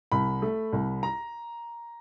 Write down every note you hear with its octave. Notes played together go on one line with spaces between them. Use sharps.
C2 B5
A3
C2
A#5